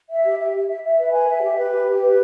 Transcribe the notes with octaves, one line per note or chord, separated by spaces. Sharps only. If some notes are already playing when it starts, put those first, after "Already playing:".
E5
G4
E5
E5
E5
E5
B4
G#5
E5
G4
B4
G4
G4
B4